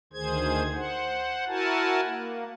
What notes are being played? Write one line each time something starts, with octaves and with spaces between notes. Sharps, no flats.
D2 D#3 G#4 C5 G#6
C5 F#5
E4 F#4 A#4 F#5 G#5 A5
A#3